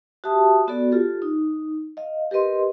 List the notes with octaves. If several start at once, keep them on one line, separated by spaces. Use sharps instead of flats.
F#4 G4 E5 A5 D#6
B3 F#4 A4 D5
F4 G4 A4
D#4
D#5 F5
G4 A#4 B4 D#5 C6